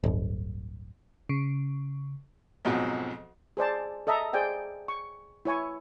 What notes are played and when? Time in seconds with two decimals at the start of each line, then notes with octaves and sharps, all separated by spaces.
0.04 D1 G1
1.29 C#3
2.65 B1 F2 G#2 B2 F3 F#3
3.57 G#4 C5 D5 A5
4.07 A4 D#5 E5 A5 A#5
4.33 G#4 C5 D5 G5 G#5
4.88 C#6
5.45 E4 C#5 G#5 C#6